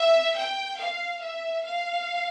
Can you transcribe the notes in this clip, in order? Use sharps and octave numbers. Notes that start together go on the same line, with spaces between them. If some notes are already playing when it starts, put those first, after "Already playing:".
Already playing: E5
G5
F5
E5
F5